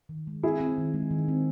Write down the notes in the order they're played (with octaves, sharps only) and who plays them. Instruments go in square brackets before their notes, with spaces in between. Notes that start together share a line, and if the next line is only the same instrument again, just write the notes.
[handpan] D#3
G#3
[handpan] C4 [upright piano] E4 G#4
[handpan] C4
D#3
G#3
D#3
C4